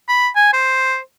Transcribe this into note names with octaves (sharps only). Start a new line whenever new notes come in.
B5
G#5
C5